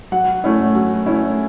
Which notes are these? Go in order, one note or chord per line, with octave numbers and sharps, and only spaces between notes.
F#3 F#5
A3 C#4 E4
F#3
A3 C#4 E4